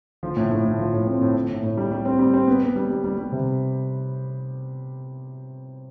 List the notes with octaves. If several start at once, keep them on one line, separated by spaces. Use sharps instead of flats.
F3
A2
A2
A2
F3
A2
C4
A2
A2
A2
A2
G3
G3
C4
G3
C4
B3
B3
G3
G3
G3
G3
C3